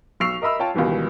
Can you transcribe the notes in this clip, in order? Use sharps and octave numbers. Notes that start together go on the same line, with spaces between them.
B1 C#6 E6 C7 F7
A#4 D#5 E5 B5 E6
F4 C#5 G5 A5
C#2 B2 D#3 E3 G3